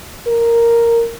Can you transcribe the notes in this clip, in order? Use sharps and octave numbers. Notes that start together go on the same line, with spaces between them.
A#4